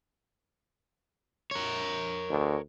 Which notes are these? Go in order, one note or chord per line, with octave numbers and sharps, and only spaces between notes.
A#4 C#5
D2